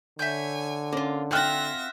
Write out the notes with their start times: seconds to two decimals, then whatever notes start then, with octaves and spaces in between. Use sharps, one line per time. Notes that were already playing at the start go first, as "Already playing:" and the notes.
0.19 D3 C#5 E5 G#5 G6
0.93 A#3 C#4 F4
1.31 C4 F4 F#4 E5 G5 F6 F#6 A#6